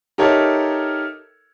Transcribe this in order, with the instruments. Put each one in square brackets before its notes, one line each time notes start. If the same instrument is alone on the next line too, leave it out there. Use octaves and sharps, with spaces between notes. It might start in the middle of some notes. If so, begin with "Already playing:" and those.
[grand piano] D#4 G4 A4 A#4 C#5 E5